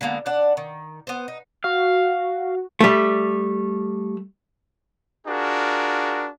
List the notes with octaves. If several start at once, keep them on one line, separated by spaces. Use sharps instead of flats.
D3 G#3 A#3 B3
D4 D5 F#5
D#3
B3 C5
D#4
F#4 F5
G3 A3
D4 F4 F#4 G#4 A#4